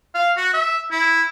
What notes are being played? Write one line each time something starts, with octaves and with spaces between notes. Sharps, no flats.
F5
F#4
E5
E4